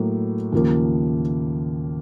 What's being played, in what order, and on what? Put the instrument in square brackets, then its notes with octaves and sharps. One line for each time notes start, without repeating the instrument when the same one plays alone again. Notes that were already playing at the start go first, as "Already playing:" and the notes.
Already playing: [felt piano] A2 F#3 A#3
D#2 C#3 F3 A#3 F4